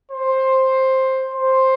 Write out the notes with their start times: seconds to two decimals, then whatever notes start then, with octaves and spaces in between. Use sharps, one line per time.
0.11 C5
1.34 C5